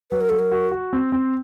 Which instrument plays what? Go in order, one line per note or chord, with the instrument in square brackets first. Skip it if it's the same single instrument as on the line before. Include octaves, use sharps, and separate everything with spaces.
[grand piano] F#3 [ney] B4
[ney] A#4
[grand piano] F#3 [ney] A4
[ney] A#4
[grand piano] F#4
F#4
C4
C4